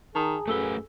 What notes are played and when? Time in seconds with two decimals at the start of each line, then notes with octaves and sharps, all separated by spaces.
0.15 D#3 G#4 A5 A#5 D#6
0.48 F#2 A3 A4 B4 E6 G7